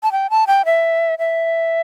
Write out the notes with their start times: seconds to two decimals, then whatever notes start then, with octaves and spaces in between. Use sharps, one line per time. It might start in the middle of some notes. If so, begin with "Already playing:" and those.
0.03 A5
0.12 G5
0.30 A5
0.47 G5
0.65 E5
1.19 E5